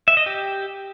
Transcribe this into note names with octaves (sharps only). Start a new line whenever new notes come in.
E5
D#5
G4